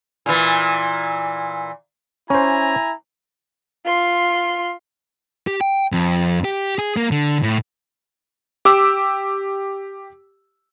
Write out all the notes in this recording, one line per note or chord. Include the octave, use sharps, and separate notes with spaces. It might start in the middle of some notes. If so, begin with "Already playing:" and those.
A#2 E3
C#4 E4 C5 G#5 A#5
F4 C6
G4
G5
F2
G4
G#4
A#3
D3
A2
G4 D6 E6